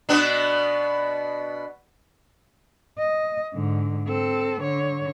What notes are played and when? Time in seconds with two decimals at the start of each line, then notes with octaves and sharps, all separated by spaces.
0.09 B2 B3 D4
2.99 D#5
3.54 G#2 D3
4.08 C4 A4
4.61 D3 C#5